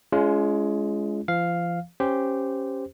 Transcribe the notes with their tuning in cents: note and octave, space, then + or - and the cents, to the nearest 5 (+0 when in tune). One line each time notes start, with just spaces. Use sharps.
G#3 +15 C#4 +30 F4 -30
F3 -35 F5 +0
C#4 -10 G4 +0 C5 -15